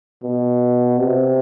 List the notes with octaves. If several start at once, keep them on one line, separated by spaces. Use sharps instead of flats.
B2
C3